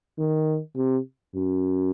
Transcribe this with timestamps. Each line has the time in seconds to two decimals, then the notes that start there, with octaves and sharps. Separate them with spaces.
0.19 D#3
0.77 C3
1.35 F#2